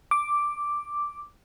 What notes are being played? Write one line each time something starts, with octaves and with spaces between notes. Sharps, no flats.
D6